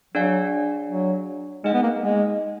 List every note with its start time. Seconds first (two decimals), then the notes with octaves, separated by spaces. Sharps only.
0.14 F#3 D4 G#4 D5 F5 G#5
0.89 F#3
1.64 G#3 D#4 G#4 D#5 F#5
1.74 B3
1.83 A#3
2.01 G#3